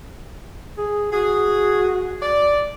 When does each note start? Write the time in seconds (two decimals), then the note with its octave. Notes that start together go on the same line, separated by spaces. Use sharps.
0.78 G#4
1.12 F#4 G#4
2.21 D5